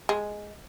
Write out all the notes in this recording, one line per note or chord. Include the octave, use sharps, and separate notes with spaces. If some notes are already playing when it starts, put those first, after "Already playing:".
G#3